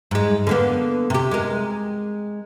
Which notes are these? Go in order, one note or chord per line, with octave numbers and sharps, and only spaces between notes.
G#2 G#3
D3 A#3 B3
C3 G4
G#3 A#4